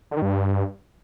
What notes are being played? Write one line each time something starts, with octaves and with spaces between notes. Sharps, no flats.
D3
D#3
G2